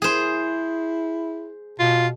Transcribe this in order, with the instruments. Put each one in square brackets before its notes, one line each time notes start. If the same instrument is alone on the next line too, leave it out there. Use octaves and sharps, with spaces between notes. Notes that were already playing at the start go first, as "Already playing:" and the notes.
[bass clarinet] E4 [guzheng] G#4 C5
[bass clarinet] B2 [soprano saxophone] F4